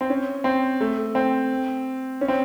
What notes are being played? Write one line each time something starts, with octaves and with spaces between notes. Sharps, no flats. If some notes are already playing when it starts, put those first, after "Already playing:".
C4
C#4
C4
A3
C4
C#4
C4